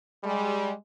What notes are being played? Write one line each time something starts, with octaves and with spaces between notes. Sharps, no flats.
G3 G#3